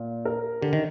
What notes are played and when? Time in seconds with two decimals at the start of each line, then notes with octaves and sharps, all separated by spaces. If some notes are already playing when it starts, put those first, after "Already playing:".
Already playing: A#2
0.25 A#4
0.61 D3 G4
0.73 D#3